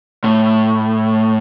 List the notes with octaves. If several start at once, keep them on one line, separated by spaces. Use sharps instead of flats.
A2